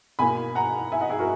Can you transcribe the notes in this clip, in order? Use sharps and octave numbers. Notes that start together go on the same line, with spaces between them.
B2 A#3 G#5 B5
F#5 A#5
E5 G#5
D#5 F#5
E4 G#4
F#4 A#4